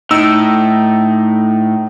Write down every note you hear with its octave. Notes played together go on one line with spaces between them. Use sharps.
A2 D#4 E6